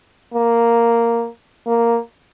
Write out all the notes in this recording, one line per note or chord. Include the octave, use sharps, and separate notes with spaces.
A#3
A#3